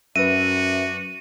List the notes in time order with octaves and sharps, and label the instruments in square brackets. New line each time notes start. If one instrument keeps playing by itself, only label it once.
[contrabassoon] F#2 [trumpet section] D4 F#4 [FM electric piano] B4 E5 [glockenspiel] D#7